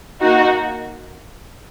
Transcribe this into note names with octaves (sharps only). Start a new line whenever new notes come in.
A#3 D#4 F#4